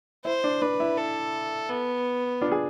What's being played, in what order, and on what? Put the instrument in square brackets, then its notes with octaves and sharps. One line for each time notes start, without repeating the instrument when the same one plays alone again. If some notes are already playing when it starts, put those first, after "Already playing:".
[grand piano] E4 [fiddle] C5
[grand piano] D4
[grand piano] D4 [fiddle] B4
[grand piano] E4
[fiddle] A4
B3
[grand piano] D4 F4
G#4